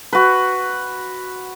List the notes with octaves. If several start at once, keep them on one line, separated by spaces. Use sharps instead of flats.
F#4 B4